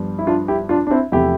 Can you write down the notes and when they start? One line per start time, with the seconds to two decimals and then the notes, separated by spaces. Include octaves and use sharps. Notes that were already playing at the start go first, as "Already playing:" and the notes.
Already playing: G2 F3 B3
0.19 E4
0.27 D4 F4
0.48 E4 G4
0.69 D4 F4
0.87 D4
0.91 C4 E4
1.12 E2 C3 F3 A3 E4 G4